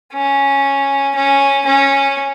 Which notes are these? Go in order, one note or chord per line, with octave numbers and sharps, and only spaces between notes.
C#4
C#4
C#4